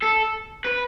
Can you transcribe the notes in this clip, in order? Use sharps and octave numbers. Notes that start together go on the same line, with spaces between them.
A4
B4